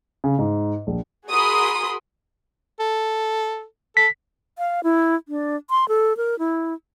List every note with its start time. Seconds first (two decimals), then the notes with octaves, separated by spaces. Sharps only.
0.24 C#3
0.39 G#2
0.87 A#1
1.29 F#4 G#4 A#4 B5 C6 D#6
2.80 A4
3.97 A4 B6
4.58 F5
4.84 E4
5.28 D4
5.70 C6
5.88 A4
6.17 A#4
6.39 E4